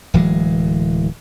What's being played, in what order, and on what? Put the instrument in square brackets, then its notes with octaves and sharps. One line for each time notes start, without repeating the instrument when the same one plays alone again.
[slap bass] D1 E3 F#3 G#3